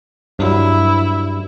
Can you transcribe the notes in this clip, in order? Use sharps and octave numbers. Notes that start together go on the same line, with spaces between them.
G2 F#3 E4